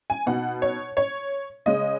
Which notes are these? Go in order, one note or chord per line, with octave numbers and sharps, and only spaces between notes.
G#5
B2 B3 D#4 F#5
C#5
C#5
C#3 G#3 C#4 D#5